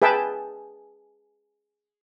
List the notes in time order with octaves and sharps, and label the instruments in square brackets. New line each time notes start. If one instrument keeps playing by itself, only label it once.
[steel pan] G#4 B4 E5 G5 A5